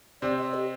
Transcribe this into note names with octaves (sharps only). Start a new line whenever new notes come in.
C3 C4 D5
D#5
G4